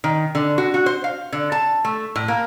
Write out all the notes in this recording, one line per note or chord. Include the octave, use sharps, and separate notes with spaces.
D#3
D3
F#4
F#4
C5
F5
D3
A5
A3
A2
A#3